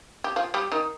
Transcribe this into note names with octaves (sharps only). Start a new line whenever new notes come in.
G4
F3 F4
G3 G4
D#3 D#4